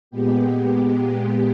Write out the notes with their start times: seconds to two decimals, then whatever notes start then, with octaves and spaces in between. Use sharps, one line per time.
0.11 A#2 G#3 B3 G4